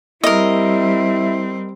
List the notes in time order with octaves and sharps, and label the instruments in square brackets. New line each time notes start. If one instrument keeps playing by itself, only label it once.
[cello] G3 C4 [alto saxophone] E4 [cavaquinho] A#4 D#5